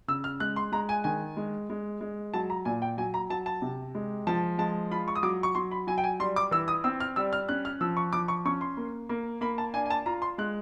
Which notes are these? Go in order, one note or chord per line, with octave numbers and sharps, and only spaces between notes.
C#3 E6
F6
G#3 F#6
C6
G#3 A#5
G#5
D#3 G#5
G#3
G#3
G#3
F#3 A5
A#5
A#2 G#5
G5
F#3 G#5
A#5
F#3 A5
A5
C3
G#3
F3 A5
G#3 A5
F4 B5
C#6
D#6
F#3 D6
C#6
F#3 C6
B5
F#3 G#5
G5
G#5
G3 C6
D6
E3 E6
D#6
C4 E6
F6
G3 E6
F6
C#4 F#6
F6
F3 E6
C#6
F3 D6
C#6
C#4 C#6
C6
A#3
A#3
A#3 B5
A5
D4 G#5
G#5
A5
F4 A#5
C6
G#3 F#6